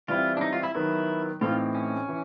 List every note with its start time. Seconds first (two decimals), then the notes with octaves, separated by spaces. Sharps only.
0.08 E3 G3 C4 E4 F4
0.37 D4
0.41 D#4
0.53 F4
0.63 E4
0.75 D#3 F#3 B3 E4
1.41 A2 E3 A3 C4 D#4 F4
1.75 C#4
2.09 E3